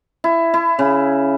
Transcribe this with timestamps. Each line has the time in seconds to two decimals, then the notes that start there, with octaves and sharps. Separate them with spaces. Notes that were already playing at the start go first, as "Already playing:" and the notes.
0.24 E4
0.54 E4
0.79 C#3